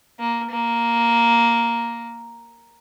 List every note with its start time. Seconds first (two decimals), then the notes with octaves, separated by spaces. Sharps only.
0.19 A#3
0.51 A#3